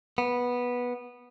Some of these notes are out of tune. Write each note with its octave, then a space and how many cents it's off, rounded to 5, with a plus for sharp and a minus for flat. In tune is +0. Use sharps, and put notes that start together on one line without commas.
B3 -10